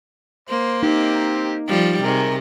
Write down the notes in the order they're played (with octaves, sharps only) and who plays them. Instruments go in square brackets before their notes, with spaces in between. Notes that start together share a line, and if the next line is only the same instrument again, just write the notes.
[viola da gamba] A#3 [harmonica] C5
[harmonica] C4 G4 [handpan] D#4
[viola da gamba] F3 G3
[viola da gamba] C3 [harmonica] D#3 G#4 A#4